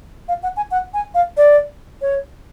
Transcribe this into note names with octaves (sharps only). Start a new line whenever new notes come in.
F5
F#5
G#5
F#5
G#5
F5
D5
C#5